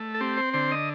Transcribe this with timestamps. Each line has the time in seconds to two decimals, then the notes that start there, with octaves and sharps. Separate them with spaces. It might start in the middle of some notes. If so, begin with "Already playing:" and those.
Already playing: A3
0.15 A4
0.20 C4 G4
0.37 C5
0.54 D3 C5
0.72 D#5